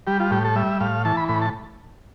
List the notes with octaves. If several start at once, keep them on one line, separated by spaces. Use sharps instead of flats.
G3 G4
F4
A2 G4
A4
G3 E5
A2 F5
E3 A5
B5
A2 B5
A5